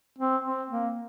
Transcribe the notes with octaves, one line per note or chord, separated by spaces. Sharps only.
C4
C4
A#3